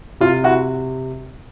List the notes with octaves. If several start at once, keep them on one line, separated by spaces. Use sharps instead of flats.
C3 F4
E4 F#4